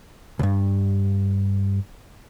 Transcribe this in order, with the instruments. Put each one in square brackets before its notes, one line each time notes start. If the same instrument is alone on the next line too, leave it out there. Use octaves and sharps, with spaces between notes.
[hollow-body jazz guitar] C#2 G2